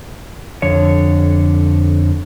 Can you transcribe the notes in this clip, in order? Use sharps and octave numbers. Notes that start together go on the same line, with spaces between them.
F2 D3 C#5